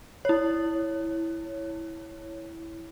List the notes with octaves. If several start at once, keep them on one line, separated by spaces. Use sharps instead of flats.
E4 C#5